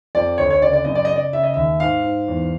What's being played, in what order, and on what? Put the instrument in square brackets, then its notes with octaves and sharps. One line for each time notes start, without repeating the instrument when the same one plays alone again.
[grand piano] F2 D5
D2 C#5
C#5
C#3 D5
D5
F#2 D#5
D5
C#3 D#5
D5
C#3 E5
D#5
D#2 E5
G#2 F5
G#2
E2